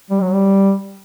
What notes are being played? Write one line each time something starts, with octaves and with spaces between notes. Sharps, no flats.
G3
F#3
G3